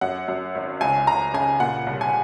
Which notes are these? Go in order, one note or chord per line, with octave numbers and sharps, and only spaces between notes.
F#2 F#5
F#2
G#1
C#2 G#5
C#2 A#5
C#3 G#5
A#2 F#5
C2
G#5